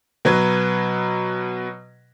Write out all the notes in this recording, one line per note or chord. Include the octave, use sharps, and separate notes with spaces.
B2 F#3 B4 G#6